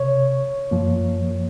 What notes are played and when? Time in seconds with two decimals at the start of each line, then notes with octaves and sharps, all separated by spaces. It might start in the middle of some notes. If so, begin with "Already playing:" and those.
Already playing: C3 C#5
0.71 F#2 F3 A#3